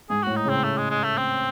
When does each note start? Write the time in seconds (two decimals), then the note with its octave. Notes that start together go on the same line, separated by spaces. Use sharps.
0.10 G#2 G#4
0.23 A2 F#4
0.36 D#4
0.45 C#3 C4
0.64 A3
0.77 G#3
0.90 G#3
1.04 A3
1.17 C4